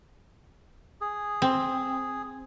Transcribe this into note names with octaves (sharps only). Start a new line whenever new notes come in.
G#4
C4